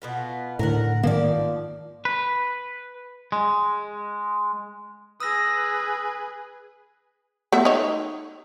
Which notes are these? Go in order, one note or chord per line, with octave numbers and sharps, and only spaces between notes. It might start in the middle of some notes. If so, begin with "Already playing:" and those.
B2 B3 F4
A2 D3 A#4 C#5 F#5
G#2 D#3 F3 A#3 D5
B4
G#3
G#4 B4 D#6 E6 A#6
A3 B3 E5
D#4 C#5